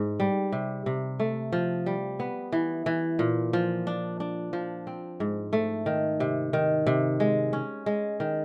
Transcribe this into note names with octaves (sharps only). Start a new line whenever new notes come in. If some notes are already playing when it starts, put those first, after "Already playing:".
Already playing: G#2
G3
C3
C3
A3
F3
G3
B3
E3
E3
A#2
F3
D4
D4
F3
C4
G#2
A3
D#3
C3
D#3
C3
G#3
C#4
G#3
D#3